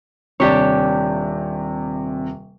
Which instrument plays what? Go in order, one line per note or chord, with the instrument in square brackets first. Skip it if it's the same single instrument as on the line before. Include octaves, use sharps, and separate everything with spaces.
[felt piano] D#1 C3 [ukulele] D4 G4 C#5